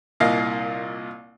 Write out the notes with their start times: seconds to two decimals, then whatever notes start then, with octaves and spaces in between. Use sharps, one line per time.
0.20 C2 A#2 D#5 F5